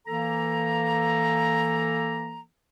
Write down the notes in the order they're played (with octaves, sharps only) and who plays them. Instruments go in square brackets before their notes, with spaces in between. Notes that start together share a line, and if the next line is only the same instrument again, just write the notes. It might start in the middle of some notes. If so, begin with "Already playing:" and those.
[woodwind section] E3 A#3 A4 A#5